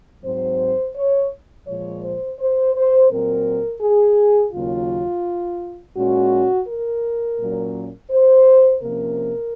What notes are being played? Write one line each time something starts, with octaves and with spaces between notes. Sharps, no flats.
G#2 F#3 C4 C5
C#5
A#2 F3 G#3 C#5
C5
C5
C5
A#2 F#3 C4 A#4
G#4
D#2 C#3 F#3 A#3 F4
A#2 G#3 C#4 F#4
A#4
A#2 F#3 A#3 C#4
C5
C3 F3 A#3 C#4 A#4